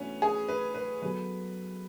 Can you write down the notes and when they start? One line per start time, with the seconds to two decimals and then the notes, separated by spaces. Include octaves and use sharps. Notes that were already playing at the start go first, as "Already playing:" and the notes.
Already playing: E3 A3 B3 C#4 D4 F#4
0.22 G#4
0.49 B4
0.74 B4
1.02 F#3 B3 F#4 A4 B4